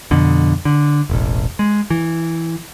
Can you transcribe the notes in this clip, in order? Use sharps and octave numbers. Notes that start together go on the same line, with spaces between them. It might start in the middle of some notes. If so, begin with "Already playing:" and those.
F2 B2 D3
D3
E1 A1
G#3
E3